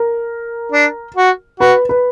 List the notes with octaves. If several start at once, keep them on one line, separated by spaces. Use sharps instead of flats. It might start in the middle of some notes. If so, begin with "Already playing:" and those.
Already playing: A#4
D4
F#4
F#4 B4
B4